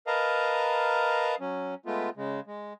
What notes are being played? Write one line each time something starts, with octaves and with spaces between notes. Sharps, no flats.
A#4 B4 D#5 F5 A5 A#5
F#3 C#4
G#3 A3 B3 F4
C#3 G#3
G#3